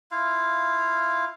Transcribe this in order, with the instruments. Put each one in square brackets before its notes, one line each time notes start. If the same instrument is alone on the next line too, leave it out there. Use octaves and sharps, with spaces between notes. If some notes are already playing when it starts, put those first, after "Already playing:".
[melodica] E4 F4 F5